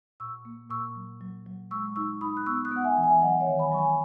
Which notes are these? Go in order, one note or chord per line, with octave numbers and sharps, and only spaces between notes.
A#2 C#6 E6
A#3
A#2 C#6 E6
F#3
F#3
F#3
G#3 C#6 E6
D#4 C#6 E6
D#4 B5 D#6
F#6
B3 C#6 E6
D#6 F#6
B3 F#5
E5 G#5
E3
E5 G#5
F#3 D#5 F#5
C#5 E5
D#3
G#5 B5
F#3 C#6
G#5 B5